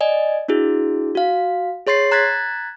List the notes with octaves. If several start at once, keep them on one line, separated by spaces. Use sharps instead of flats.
D5 D#5 G#5
D4 E4 F#4 G#4
F#4 F5
G#4 C#5 C6 A6 C7
A#5 F#6 G#6 A6 B6